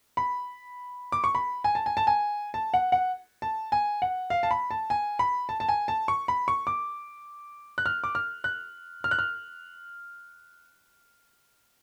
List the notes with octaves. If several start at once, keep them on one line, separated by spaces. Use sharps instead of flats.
B5
D6
C#6
B5
G#5
A5
G#5
A5
G#5
A5
F#5
F#5
A5
G#5
F#5
F5
A5
B5
A5
G#5
B5
A5
A5
G#5
A5
C#6
B5
C#6
D6
F#6
F6
D6
F6
F#6
F6
F#6
F6